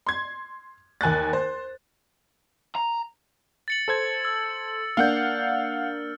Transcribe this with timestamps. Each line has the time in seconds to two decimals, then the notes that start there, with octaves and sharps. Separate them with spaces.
0.06 C6 G#6
1.01 D#2 G#5 F#6 A6
1.33 C5
2.76 A#5
3.68 A6 C#7 F#7
3.88 A4 C5 G#6
4.25 E6
4.97 A#3 D4 F5 F#5 F6 G6